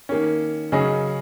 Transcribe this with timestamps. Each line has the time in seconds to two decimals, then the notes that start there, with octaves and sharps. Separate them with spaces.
0.09 D#3 A#3 C#4
0.72 C#3 F#3 C#4 G#4 D#5